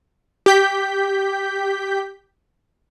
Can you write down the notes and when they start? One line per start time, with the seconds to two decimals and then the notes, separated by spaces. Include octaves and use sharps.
0.46 G4 G6 B6